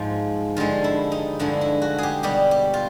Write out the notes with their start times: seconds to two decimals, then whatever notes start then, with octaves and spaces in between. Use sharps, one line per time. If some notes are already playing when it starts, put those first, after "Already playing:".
Already playing: G#2 F3 G#3
0.56 G2 D3 F3 G#3 F4
0.84 E4
1.12 D#4
1.39 G2 D3 F3 G#3 E4
1.61 E4
1.82 F#4
1.98 G4 G#4
2.23 B2 G3 G4
2.51 G4
2.74 F4